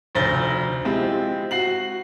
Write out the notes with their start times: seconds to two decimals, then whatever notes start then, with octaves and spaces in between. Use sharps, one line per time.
0.15 F1 D2 C5 A6 A#6 G7
0.85 G#3 C4 E4 F4 G4
1.51 F#4 C7 F#7